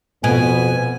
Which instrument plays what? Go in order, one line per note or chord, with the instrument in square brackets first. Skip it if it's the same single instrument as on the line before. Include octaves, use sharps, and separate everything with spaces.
[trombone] F2 [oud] B2 [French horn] B3 [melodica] G#5